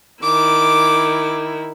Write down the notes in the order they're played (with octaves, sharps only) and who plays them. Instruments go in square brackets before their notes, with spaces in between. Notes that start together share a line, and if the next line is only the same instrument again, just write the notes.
[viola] D#3 E4 [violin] D6